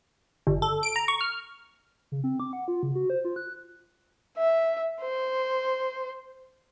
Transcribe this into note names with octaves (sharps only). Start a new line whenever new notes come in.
G1
A4
D7
A#5
C#6
F6
C#3
C4
D6
F#5
F4
C#3
F#4
C5
F4
F#6
E5
C5